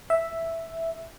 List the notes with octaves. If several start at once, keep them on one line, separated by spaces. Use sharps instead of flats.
E5